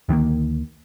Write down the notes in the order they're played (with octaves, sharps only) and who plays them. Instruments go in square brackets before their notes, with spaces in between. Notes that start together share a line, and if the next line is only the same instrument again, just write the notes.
[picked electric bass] D2 D#3 E3 A#3